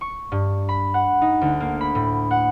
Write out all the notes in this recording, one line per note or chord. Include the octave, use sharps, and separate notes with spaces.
C#6
G2
B5
F#5
D#4
D2
A#3
B5
A2
F#5